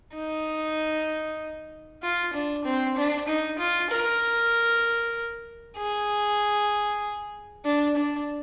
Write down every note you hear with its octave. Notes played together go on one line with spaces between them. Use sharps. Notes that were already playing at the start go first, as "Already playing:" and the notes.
D#4
F4
D4
C4
D4
D#4
F4
A#4
G#4
D4
D4